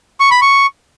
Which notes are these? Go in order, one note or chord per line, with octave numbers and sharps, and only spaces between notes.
C#6
B5
C#6